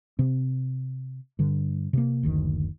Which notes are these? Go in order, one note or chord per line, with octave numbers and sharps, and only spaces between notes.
C3 C4
G2 D3
C3 A#3
F#1 D2 D#3